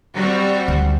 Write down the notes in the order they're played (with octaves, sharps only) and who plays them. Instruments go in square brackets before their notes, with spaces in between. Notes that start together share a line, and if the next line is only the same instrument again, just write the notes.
[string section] G3 C4 F#4
[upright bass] D2